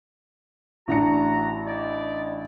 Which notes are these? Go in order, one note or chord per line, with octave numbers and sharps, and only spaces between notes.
A1 D4 F#4 A#5 C#7
D#4 E4 D5